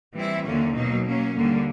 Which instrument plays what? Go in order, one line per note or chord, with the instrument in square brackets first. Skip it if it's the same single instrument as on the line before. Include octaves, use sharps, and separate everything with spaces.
[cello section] E3 G3 C4 E4
D#2 D3 F#3 A#3 C#4
B2 F#3 A#3 D#4
F#3 A#3 C#4
D#2 D3 G3 A#3